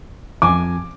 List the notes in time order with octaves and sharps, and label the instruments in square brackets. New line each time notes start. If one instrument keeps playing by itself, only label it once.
[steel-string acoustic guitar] F2 G#5 [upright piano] D6